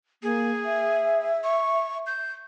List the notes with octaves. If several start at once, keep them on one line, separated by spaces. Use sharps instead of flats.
A#3 G#4
E5
C#6
G6